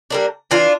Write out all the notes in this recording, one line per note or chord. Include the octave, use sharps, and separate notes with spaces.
G3 A#3 D4
E3 D4 F4